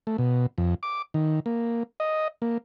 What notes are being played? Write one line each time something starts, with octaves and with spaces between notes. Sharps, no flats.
A3
B2
F2
D6
D#3
A#3
D#5
A#3